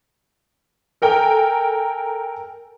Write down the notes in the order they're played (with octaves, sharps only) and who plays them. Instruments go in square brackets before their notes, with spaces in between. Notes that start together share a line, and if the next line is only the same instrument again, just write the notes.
[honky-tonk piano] A4 A#4 G5 G#5